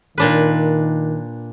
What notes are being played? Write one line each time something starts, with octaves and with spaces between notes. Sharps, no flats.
A#2 D#3 D4 B4